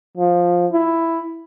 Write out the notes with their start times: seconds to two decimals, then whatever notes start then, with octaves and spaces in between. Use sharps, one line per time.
0.17 F3
0.72 E4